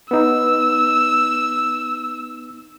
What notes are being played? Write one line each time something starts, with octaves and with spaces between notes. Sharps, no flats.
B3 D#4 E6